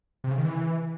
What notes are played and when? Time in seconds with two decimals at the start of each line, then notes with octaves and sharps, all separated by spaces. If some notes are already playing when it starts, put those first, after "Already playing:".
0.24 C3
0.31 C#3
0.38 D#3
0.45 E3